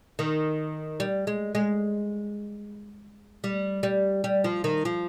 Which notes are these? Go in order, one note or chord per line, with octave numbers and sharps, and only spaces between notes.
D#3
G3
G#3
G#3
G3
G3
G3
F3
D#3
F3